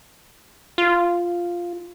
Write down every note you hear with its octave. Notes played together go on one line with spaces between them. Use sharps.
F4